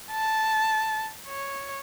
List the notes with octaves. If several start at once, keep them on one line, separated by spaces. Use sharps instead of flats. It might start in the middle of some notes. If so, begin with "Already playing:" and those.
A5
C#5